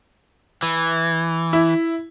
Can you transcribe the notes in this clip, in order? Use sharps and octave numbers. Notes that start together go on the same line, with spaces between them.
E3
E4